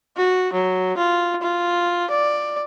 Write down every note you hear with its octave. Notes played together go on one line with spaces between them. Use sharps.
F#4
F#3
F4
F4
D5